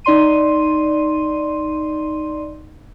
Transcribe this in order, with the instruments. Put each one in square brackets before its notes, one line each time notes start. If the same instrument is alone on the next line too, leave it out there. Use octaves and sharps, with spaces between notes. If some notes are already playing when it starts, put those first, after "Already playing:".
[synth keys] D#4 D5 C6 D#7